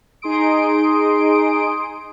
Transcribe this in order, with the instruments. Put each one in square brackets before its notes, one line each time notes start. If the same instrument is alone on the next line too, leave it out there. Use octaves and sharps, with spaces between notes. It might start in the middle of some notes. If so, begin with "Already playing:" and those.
[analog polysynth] D#4 G#4 C6 D#6 D7